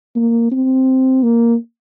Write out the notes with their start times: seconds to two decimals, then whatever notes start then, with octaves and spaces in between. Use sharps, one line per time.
0.15 A#3
0.51 C4
1.23 A#3